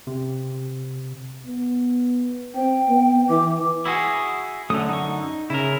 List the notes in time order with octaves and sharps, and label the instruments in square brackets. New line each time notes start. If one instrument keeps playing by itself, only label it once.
[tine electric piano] C3
[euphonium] B3
[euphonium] C4 [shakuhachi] G5
[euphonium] B3
[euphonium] E3 [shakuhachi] D6
[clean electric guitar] E4 F#4 G#4
[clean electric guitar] F#2 D3 [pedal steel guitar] A3 D#6
[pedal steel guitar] D#4 C#6
[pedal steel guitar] C#3 [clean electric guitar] E4 A#4